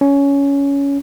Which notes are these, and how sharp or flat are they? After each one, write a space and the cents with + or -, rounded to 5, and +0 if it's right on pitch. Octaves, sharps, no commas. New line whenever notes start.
C#4 +15